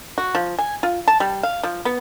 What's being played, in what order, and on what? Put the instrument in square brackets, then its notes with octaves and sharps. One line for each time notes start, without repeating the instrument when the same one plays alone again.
[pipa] F#4
F3
G#5
F4
A5
G3
F5
F3
B3